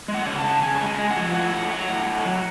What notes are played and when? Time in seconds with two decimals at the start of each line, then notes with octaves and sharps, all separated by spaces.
0.08 G#3
0.14 F#5
0.26 C#3
0.39 A5
0.44 C#3
0.62 C#3 G#5
0.78 A5
0.81 G#3
0.86 G#5
0.98 G#3
1.10 F#5
1.17 F3
1.34 A2 F#5
1.53 A2
1.71 F#3 F#5
1.89 A2
2.07 A2
2.26 F#3